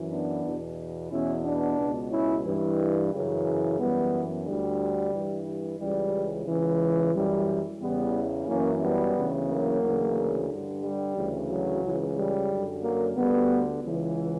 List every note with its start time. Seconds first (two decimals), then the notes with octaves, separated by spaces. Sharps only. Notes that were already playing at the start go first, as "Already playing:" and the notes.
Already playing: F#2 E3
0.10 B3 D4
0.44 E2 B2
1.10 E2 B2 C#4 E4
1.44 B3 D4
1.77 C#2 B2
2.11 C#4 E4
2.44 G2 E3
3.11 F#2 C#3 E3
3.78 F#2 E3 G3 B3
4.45 D2 D3 G3
5.12 G2 E3
5.80 C#2 C#3 E3 G3
6.46 C#2 C#3 E3
7.13 F#2 E3 G3
7.80 E2 C#3 E3 G3 B3
8.47 F#2 E3 A#3 C#4
8.81 G3 B3
9.14 D2 C#3 E3
9.48 F#3 A#3
9.81 D2 C#3 E3
10.48 G2 D3
10.81 G3
11.15 D2 C#3 E3
11.49 F#3
11.82 C#2 C#3 E3
12.16 G3
12.49 F#2 D3
12.83 F#3 A#3
13.16 D2 D3 G3 B3
13.83 C#2 C#3 E3